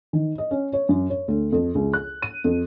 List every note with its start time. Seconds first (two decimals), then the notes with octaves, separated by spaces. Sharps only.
0.13 D#3
0.38 D#5
0.51 C#4
0.73 C#5
0.89 F#2
1.10 C#5
1.28 D2
1.52 F2
1.75 C#2
1.93 F#6
2.22 D#7
2.44 F2